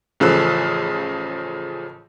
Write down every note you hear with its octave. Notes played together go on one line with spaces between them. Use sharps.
A1 C#3 F3 A4 E6 F#6